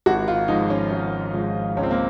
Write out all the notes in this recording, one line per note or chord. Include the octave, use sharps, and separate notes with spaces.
G#1 F#4
F4
G#2 F3 D#4
C#4
G#1 C#4
G#2 F3
C#2 C#4
C4
A#3